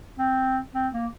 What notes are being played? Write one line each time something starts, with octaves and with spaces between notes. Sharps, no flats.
C4
C4
A#3